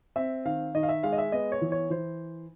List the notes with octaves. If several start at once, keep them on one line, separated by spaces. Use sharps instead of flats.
C4 E5
D#3 F5
D#3 D#5
F5
E5
G#3 F5
D#5
E5
B3 D#5
C#5
E3
C#5
E3 C5